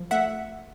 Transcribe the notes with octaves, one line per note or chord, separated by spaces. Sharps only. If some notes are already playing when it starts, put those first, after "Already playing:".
Already playing: F3
A3 E5 F#5